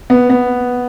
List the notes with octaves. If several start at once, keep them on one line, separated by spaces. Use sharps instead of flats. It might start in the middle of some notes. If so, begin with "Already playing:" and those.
B3
B3